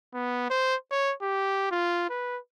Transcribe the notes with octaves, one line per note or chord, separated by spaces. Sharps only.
B3
C5
C#5
G4
F4
B4